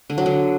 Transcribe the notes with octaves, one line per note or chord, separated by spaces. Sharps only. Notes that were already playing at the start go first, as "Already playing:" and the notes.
D3
F#3
D3